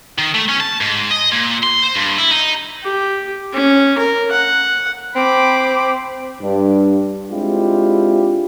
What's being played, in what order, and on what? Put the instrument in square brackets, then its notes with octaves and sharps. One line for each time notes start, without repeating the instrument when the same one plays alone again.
[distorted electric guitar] D#3
A3
C#4
A5
G#2
D#5
A#2
C6
C5
G2
E4
D#4
[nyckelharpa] G4
C#4
A#4
F#5
[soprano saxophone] C4 [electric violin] B5 D6
[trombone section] G2
G#3 C4 D4 E4 F4 G4